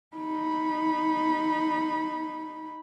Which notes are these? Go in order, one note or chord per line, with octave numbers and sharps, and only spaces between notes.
D#4 B5